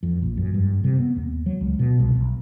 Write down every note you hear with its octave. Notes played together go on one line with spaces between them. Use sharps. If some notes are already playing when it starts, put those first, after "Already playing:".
F2
A#1
F#2
G2
C3
B3
D#2
F#3
C#2
B2
C2
B1